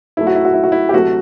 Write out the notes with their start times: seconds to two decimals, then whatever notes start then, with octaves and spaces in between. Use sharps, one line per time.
0.17 F#2 F#3 A3 E4
0.27 F#4
0.36 E4
0.45 F#4
0.54 E4
0.64 F#4
0.72 E4
0.89 G4
0.93 D2 C3 F#3 A3 F#4